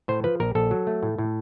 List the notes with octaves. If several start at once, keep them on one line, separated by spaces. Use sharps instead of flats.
A2 C5
F3 B4
A#1 A#4
A#1 A4
F#3
A3
A2
A2